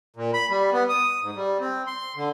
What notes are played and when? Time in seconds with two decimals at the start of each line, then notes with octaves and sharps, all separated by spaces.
0.16 A#2
0.34 B5
0.50 G3
0.73 B3
0.89 D#6
1.22 G#2
1.36 G3
1.60 C4
1.87 C6
2.16 D3